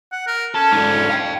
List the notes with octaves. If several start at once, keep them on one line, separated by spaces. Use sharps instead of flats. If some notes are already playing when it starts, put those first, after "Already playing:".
F#5
A#4
C#4 A4
G#2 D3
F5 G5